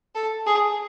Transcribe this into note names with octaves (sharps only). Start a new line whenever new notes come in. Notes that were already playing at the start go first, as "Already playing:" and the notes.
A4
G#4